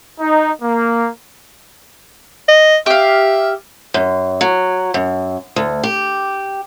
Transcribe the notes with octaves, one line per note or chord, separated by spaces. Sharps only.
D#4
A#3
D#5
G4 E5 F5
F#2
F#3
F#2
D2
G4